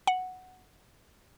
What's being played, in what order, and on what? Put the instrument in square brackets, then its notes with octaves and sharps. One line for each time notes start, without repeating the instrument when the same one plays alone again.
[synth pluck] F#5